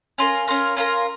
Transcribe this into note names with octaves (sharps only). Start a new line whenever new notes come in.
C#4 F4 A#4
C#4 F4 A#4
C#4 F4 A#4